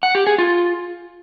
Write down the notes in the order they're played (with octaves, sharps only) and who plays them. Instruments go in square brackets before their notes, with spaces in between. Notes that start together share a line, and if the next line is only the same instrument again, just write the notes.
[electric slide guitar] F#5
G4
G#4
F4